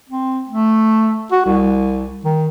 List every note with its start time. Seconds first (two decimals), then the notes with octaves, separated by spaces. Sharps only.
0.09 C4
0.49 A3
1.32 F#4
1.45 C2
2.24 D#3